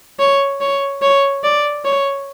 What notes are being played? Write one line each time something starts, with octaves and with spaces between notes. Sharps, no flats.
C#5
C#5
C#5
D5
C#5